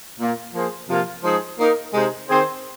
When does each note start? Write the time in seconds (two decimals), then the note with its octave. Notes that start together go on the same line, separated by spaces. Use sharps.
0.20 A#2 A#3 F4
0.54 F3 A#3 G#4 C5
0.89 C3 F3 A#3 F4
1.24 F3 G#3 D#4 G#4 C5
1.59 A#3 D#4 A#4
1.94 C3 G#3 D#4 G#4 C5
2.29 D#3 C4 G#4 C5